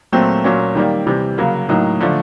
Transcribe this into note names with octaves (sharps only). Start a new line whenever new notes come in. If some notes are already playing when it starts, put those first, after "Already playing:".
A#2 F#3 A3 C4
A#2 F#3 A#3 C#4
D#3 G3 A#3
C3 E3 G3
C#3 F#3 A#3
A2 F#3 A#3 D#4
D3 F3 A3